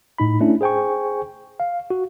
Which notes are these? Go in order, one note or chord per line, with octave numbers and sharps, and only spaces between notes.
A2 D#4 B5
A3 C#4 D4 E4
G#4 C5 G5 G#5 C#6
F5
F#4